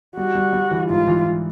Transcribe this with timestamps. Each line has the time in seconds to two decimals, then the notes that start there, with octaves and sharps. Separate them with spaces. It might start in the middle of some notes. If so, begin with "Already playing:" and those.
0.17 G3 F#4
0.35 G3
0.53 G3
0.71 E3
0.90 G#2 F4
1.07 E3
1.26 E3